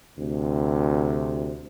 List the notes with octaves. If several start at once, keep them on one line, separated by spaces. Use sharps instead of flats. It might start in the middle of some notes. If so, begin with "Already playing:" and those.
D2 C3